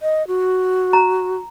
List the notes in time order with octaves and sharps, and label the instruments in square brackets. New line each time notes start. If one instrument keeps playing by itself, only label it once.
[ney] D#5
F#4
[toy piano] A#5